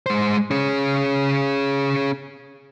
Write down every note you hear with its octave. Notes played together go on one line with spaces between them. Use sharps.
G#3 C5
C#4 G#4